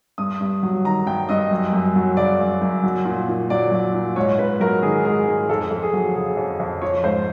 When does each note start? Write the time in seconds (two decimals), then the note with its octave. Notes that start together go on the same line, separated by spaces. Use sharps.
0.18 G2 D#6
0.41 G2
0.63 F#3
0.84 D#3 A#5
1.06 G2 G5
1.29 G2 D#5
1.51 F#2
1.73 F#2
1.96 F#3
2.17 C#3 D5
2.39 F#2
2.62 F#2
2.83 F#3
3.05 A#2
3.28 A#2
3.50 F#3 D5
3.72 F#3
3.94 A#2
4.16 G#2 C#5
4.39 G#2 B4
4.60 F#3 A#4
4.82 D#3 G#4
5.05 G#2 G#4
5.27 G#2 G#4
5.49 F2 A4
5.71 F2
5.83 G#4
5.93 F#3
6.15 C#3 G#4
6.37 F2
6.60 F2
6.82 F3 C#5
7.03 G#2 C5